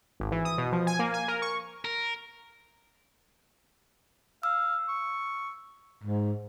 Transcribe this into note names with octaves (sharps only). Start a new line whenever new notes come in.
G#1
E3
D#6
B2
F3
G#5
A#3
G#5
A#4
C#6
A#4
F5 E6
C#6
G#2